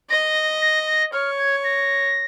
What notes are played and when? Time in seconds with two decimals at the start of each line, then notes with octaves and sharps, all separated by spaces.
0.10 D#5 A#6
0.62 A#6
0.87 A#6
1.13 C#5 F6
1.38 G#6
1.64 A#6